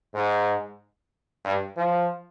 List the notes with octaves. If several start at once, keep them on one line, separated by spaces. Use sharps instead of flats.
G#2
G2
F3